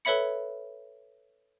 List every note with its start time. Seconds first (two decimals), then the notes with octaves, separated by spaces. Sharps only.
0.05 A4 B4 C#5 E5 B5 C#7